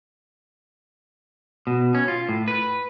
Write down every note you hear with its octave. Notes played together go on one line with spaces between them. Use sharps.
B2
C#4
F4
A2
B4